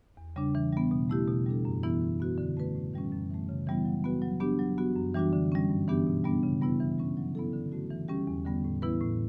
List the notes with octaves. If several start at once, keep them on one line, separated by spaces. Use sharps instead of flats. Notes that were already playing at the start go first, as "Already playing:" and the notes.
E2
C#3 G3 D4
E3
G3 B3
B2
A3 E4 G4
B2
G3 D4 A4
F#2
E3 B3 E4
E3
B3 F#4 B4
D3
A3 C#4 F#4 B4
A2
E3 G3 C#4
F#2
E3 A3
C#3
E3 G3 B3 E4
F#3
B3 F#4 B4
F#3
B3 D4 G4
F#3
B3 F#4
F#2
E3 G3 D4 F#4
D3
G3 C#4
G2
E3 B3 D4 G4
B2
G3 B3 D4
C#3
G3 B3 E4 B4
E3
G3 C#4
F#3
B3 E4 A4
D3
A3 C#4 F#4
E3
G3 C#4 G4
E2
D3 G3 B3
A2
E3 B3 E4 B4
A2